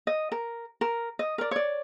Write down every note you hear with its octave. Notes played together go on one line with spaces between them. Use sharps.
D#5
A#4
A#4
D#5
A#4 D5
C#5 D5